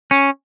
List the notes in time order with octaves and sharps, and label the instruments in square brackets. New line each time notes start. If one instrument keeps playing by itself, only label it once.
[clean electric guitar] C#4